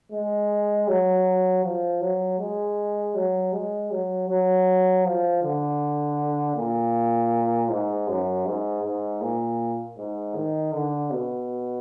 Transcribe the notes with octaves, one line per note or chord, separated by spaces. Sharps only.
G#3
F#3
F3
F#3
G#3
F#3
G#3
F#3
F#3
F3
D3
A#2
G#2
F#2
G#2
G#2
A#2
G#2
D#3
D3
B2